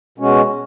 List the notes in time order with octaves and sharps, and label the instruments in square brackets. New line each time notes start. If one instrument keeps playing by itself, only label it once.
[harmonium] B2 G#3 C#4 F#4